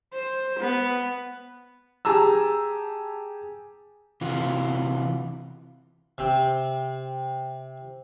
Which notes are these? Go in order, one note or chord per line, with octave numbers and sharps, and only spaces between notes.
C5
B3
G4 G#4 A5 A#5 E6
C3 E3 F4 F#4
C3 C4